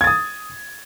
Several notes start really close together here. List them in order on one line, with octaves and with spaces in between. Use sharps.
G#6 A6 D#6